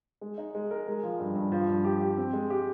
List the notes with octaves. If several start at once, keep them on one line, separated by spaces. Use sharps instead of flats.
G#3
D#4
G#3
A#4
G#3
F3
G2
G2
F3
G2
G4
G4
C4
G#3
G4